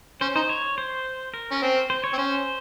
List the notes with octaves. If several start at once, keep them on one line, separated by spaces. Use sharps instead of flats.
C#4 C5
D#4 C5
C#5
C5
A#4
C#4
C4
C5
C#5
C4
C#4 C5